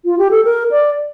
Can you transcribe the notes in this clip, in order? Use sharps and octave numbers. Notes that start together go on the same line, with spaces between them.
F4
G4
A4
A#4
D5